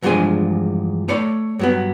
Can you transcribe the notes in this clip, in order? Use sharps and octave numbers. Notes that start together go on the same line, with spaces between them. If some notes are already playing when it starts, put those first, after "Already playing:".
E2 G2 F3 G#3 D4 G#5
A3 C#5 D5 B5
G2 F#3 B3